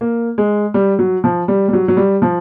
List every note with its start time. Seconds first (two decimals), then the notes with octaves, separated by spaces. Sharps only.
0.01 A#3
0.38 G#3
0.74 G3
0.99 F#3
1.24 F3
1.48 G3
1.68 G3
1.73 F#3
1.88 F#3
1.97 G3
2.22 F3